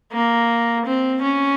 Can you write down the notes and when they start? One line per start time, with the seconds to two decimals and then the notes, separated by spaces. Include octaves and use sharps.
0.12 A#3
0.85 C4
1.22 C#4